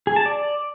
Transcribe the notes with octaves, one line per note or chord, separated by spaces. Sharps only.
G#4
A5
D5